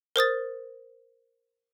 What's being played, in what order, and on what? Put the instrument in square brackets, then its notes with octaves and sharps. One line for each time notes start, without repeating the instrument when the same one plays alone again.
[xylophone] A#4 C5 D#6 A6